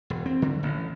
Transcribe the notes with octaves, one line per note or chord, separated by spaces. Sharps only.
E1
C4
D3
A1